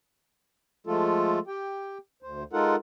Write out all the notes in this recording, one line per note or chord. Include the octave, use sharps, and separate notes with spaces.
F3 G#3 A3 F4 A4
G4 G5
D2 C5
G#3 D#4 F4 A4 A#4 F#5